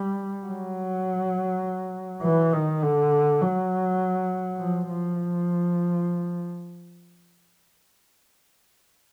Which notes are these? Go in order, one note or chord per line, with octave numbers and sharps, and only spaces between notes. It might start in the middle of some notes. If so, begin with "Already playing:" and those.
Already playing: G3
F#3
E3
D#3
D3
F#3
F3
F3